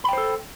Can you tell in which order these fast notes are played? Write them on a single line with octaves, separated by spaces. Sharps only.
B5 G5 C5 A4